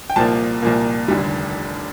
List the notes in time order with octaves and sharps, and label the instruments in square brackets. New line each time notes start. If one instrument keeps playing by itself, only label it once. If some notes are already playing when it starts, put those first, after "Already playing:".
[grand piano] G5
C2 A#2 F3 A#3 A5
C2 A#2 F3 A#3
F1 D#2 D3 G3